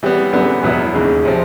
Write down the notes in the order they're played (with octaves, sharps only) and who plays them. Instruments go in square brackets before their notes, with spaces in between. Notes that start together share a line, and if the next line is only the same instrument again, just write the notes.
[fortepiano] E3 G3 B3
F#2 D3 G3 B3
E2 B2 F#3 B3 E4
D#2 C#3 E3 G#3
C3 F3